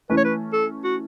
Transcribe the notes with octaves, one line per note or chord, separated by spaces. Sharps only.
E3 A3 C#4 B4
C#5
B4
A4
F#4